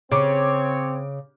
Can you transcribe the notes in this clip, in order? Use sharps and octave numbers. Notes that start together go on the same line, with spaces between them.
C#3 C4 C#5 D6